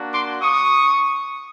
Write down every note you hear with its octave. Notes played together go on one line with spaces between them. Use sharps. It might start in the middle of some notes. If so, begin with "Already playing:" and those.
Already playing: A#3 D4 F#4
C6 D6
C#6 D#6